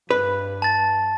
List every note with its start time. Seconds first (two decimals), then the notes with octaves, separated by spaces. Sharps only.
0.11 G2 B4
0.62 A5 A6